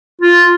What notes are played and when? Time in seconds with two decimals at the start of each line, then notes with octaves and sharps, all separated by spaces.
0.21 F4